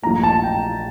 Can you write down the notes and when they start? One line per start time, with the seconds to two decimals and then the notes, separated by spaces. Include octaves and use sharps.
0.03 A#1 A#2 A3 A#5
0.23 A5
0.43 G5